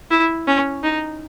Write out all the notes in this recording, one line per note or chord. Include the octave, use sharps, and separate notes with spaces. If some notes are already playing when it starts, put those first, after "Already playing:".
E4
C#4
D#4